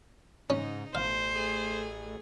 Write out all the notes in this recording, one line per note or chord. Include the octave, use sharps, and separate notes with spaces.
G#2 C#3 C#4 D#4
A1 B2 C5 F5
A3 G#4